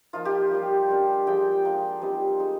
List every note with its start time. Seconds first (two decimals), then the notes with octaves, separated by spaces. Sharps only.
0.13 F3 A#3 D#4 F4
0.25 G4
0.51 G3 A#3 F4
0.90 G3 A#3 D4
1.27 F3 G#3 D4 G5
1.65 A#3 F4
2.02 G3 C4 D#4
2.40 G#3 D#4